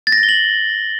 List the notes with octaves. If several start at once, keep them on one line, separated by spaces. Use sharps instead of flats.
A6
A#6
A6
G7
F#7